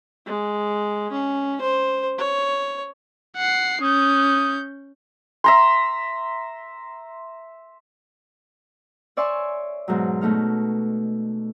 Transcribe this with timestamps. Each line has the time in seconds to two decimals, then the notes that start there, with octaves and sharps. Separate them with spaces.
0.26 G#3
1.12 C#4
1.62 C5
2.18 C#5
3.37 F#5 C7
3.82 C#4 D#6 G6
5.44 E5 A#5 C6
9.17 C#5 D5 E5 G#5 C6 C#6
9.88 G#2 B2 F#3
10.21 B2 A3 D#4 F6